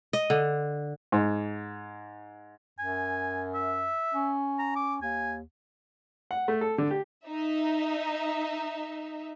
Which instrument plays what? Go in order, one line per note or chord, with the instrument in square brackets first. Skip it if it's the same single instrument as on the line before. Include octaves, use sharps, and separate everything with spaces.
[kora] D#5
D3
[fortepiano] G#2
[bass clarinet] F#2 [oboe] G#5
[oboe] E5
[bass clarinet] C#4
[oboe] A#5
D6
[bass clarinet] D#2 [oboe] G#5
[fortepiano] F#5
A3
A4
D3
G4
[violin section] D#4 E5